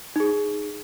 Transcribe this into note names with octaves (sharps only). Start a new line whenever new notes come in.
D#4 G#4